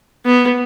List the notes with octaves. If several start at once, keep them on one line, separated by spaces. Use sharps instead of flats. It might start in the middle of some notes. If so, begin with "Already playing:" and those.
B3